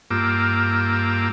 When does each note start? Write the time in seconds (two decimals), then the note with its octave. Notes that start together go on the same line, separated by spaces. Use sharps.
0.11 G2 A#3 F4 D6 E6